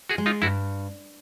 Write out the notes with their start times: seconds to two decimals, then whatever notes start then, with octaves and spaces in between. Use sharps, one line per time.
0.09 F#4 G#4
0.18 G#3
0.26 D#4 F4
0.42 G2 E4 F#4